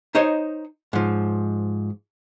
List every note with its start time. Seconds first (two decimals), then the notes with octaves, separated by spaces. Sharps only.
0.15 D#4 C5 C#5 D#5
0.93 G#2 F3